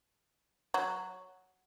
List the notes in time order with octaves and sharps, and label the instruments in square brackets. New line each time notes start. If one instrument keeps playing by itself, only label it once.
[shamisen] F#3